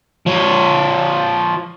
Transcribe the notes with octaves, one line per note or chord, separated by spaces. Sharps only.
F3 C#5